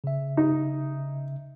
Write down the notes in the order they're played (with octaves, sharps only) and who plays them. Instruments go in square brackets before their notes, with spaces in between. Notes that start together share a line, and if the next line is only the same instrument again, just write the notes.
[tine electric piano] C#3 E5
[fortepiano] D#4